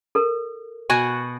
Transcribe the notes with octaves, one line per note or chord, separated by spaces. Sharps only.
A4 A#4
B2 F#4 G#5